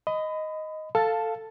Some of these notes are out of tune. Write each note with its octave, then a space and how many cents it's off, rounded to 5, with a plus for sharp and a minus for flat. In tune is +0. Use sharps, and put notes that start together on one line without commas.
D#5 +5 B5 +30
A4 +10 F5 +0 A5 +0